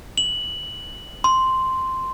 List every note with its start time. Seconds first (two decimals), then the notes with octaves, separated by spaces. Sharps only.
0.18 F#7
1.24 C6